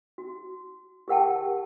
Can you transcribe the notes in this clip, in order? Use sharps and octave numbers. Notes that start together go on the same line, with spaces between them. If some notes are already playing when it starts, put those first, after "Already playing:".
F#4
G4 G#4 A#4 F#5 G5 A5